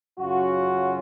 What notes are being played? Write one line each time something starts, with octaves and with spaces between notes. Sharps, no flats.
F#2 C#3 F#3 C#4 F4 F#4